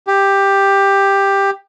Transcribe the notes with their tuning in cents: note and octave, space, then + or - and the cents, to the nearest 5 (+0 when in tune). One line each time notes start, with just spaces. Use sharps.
G4 +10